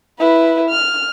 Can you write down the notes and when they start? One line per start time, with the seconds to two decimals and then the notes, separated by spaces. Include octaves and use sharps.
0.19 E4 B4
0.70 F6